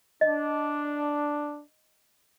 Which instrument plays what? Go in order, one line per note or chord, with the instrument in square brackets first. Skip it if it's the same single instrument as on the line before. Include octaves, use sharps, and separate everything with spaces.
[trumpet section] D4 [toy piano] D#5